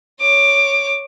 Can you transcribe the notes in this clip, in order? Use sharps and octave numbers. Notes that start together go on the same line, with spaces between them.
C#5 D6